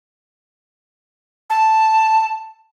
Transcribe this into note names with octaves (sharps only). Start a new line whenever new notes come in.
A5